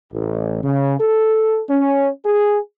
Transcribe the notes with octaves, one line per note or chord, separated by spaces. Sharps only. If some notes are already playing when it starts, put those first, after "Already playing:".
A1
C#3
A4
C#4
G#4